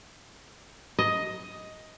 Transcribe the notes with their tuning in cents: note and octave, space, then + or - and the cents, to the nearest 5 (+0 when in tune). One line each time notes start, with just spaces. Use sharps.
D#5 +10